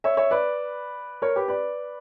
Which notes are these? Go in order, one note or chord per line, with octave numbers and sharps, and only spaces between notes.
C#5 E5
C#5 E5
B4 D5
A#4 C#5
G4 B4
B4 D5